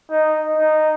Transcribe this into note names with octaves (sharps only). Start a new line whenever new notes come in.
D#4
D#4